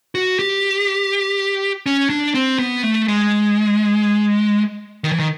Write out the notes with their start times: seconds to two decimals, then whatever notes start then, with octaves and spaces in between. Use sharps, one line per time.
0.15 F#4
0.39 G4
1.86 C#4
2.10 D4
2.35 C4
2.59 B3
2.83 A3
3.08 G#3
5.04 D#3
5.12 E3
5.19 D#3